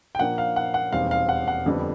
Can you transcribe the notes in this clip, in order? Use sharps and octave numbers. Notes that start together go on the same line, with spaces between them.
G5
A#2 F3 A#3 D4 F#5
F5
F#5
F#5
E1 D#2 D#3 G3 C4 F5
F5
F#5
F#5
F2 D3 G3 B3